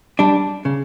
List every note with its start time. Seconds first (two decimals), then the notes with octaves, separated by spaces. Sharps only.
0.19 G3 D4
0.65 C#3